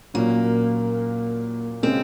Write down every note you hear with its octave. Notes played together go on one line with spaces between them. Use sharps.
A#2 F#3 A#3 C#4
C#3 G#3 C4 C#4